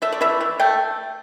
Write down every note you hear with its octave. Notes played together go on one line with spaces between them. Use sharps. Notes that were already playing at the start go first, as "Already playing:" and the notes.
A3 E5
D5
E3 E5
E3
A3 G5